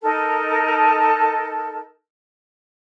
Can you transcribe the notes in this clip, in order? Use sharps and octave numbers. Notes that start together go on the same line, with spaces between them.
D#4 A4 A#4 A5